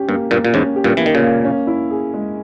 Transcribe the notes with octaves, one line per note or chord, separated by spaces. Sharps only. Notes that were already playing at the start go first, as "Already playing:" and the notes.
Already playing: C#4 G4
G2 A#3
G2 A#2 A#3
A#2
E2 G#2 C#4
G4
G2 A#2
E3 A#3
D#3
A#2 C#3
A#3
C#4
E4
G#4
G#3